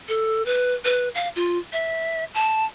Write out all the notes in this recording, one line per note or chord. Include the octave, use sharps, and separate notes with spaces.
A4
B4
B4
F5
F4
E5
A5